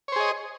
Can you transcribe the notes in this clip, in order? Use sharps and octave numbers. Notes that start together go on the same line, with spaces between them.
G#4 C5 C#5 D#5